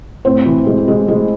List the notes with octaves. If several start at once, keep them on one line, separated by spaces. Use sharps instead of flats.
A2 C4 C5
E3
G#3
G#3
G#3